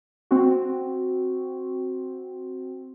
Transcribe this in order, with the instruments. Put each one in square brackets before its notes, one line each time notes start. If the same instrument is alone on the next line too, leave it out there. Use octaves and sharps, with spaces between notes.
[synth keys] C4 F#4